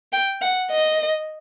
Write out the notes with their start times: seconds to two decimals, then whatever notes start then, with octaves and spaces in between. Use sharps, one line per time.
0.13 G5
0.42 F#5
0.72 D#5